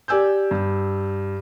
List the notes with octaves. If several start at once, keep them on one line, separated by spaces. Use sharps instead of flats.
G4 D5 G#5 E6 G6
G2